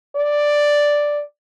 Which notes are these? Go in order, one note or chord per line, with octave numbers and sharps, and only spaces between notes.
D5